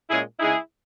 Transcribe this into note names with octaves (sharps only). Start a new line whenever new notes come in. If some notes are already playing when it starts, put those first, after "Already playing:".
A#2 G#3 C#4 E4 G#4
C#3 G#3 D#4 E4 G#4